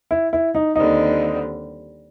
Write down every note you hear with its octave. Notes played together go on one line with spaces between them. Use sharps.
E4
E4
D#4
D#2 D3 G3 C4 D#4